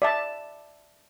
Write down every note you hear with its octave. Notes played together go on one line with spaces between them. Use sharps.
D5 E5 A5